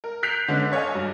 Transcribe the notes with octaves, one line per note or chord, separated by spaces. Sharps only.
A#4
F#6 G6 B6 C7 D7 F7
D3 G#3 B3 C#4
A4 C#5 D#5 F5 G#5
G2 F#3